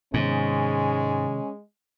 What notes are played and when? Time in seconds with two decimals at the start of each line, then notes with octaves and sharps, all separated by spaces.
0.14 G#2 C3 D#3 G#3 B3 C#4